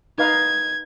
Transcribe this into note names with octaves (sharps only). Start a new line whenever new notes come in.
D#4 B4 F5 G#6